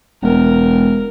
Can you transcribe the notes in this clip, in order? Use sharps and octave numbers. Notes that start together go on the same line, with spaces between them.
E1 A#4